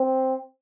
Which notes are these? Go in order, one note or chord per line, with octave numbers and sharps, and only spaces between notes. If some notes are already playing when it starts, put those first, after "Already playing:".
Already playing: C4